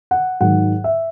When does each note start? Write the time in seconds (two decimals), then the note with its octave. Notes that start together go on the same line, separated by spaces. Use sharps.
0.11 F#5
0.41 G#2 D#3 F#3 F#5
0.84 E5